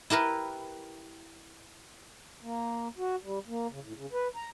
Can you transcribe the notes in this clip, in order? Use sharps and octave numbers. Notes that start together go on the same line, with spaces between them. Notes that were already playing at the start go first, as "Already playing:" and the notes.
E4 G4 A#4 B4
A#3
F#4
G3
A#3
C#3
A2
C#3
B4
A#5